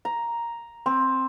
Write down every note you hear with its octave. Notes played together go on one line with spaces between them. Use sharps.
A#5
C4